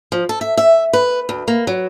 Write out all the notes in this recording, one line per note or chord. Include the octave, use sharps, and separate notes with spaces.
F3
A4
E5
E5
B4
D2
A#3
F#3